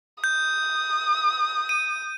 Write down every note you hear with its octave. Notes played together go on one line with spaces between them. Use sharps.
D#6 G6
D#7